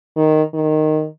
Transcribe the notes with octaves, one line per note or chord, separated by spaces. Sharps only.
D#3
D#3